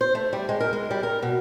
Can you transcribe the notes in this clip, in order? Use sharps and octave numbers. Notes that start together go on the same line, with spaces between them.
C5
A3
G3
G#3
A#4
G#3
G3
A#4
B2